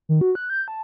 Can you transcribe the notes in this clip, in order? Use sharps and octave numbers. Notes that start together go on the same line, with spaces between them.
D#3
F#4
F#6
G6
A5